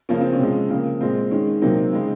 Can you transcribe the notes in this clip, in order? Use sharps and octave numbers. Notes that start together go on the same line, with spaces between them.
C#3 F3 A#3 C#4
C4
C#4
C3 F3 G#3
C#3 F3 A#3
A#2 G#3 C4
D#3 G#3 C#4
C3 F#3 A#3 C4 D#4
C#3 G#3